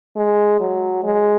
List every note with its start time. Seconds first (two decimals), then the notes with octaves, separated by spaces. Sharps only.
0.17 G#3
0.60 F#3
1.04 G#3